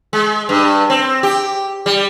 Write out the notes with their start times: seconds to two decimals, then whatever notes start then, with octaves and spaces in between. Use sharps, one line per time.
0.13 G#3
0.49 G2
0.90 C4
1.23 G4
1.86 G3